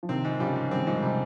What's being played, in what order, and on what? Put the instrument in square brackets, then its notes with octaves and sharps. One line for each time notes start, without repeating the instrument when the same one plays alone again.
[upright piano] F3
[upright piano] C3 D#3 [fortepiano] C4
[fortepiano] G#2
[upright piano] C#3 F3 [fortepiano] G3
[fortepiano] G#2
[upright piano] D#3 G3 [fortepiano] C4
[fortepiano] G#2 [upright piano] F3 G#3
[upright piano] C3 [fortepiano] G3